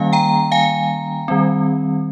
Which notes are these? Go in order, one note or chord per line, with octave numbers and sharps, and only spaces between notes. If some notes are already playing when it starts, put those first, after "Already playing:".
Already playing: D#3 G3 A#3 C#4 F5 G#5
G5 A#5
F5 G#5
D#3 G3 C4